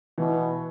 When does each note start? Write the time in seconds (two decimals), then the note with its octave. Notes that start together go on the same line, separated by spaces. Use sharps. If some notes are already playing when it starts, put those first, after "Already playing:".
0.18 B2 E3